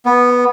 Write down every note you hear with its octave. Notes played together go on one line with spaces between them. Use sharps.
B3